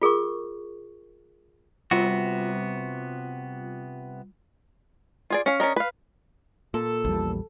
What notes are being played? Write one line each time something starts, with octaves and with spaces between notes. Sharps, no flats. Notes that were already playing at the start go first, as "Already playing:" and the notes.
F4 G#4 A#4 C#6
C3 G3 B3 F4 F#4
F4 G#4 D5
C#4 F5
C#4 D4 A#4 D#5
B4 F5
A#2 A4
A#1 E2 G3